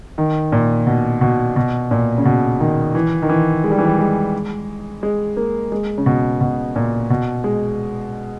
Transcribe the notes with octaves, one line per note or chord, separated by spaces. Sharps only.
D#3
A#2
B2
B2
B2
A#2
C#3
B2
D#3
E3
D#3
E3
G#3
G3
E3
G3
G#3
G#3
A#3
G#3
C#3
B2
B2
A#2
B2
G#3